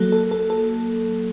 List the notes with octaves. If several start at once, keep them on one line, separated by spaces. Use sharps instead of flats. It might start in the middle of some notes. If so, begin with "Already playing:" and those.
Already playing: F#3 A#3 A4
A4
A4
A4